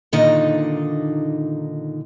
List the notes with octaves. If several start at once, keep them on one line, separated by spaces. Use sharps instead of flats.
A#2 D3 D#3 D#4 D#5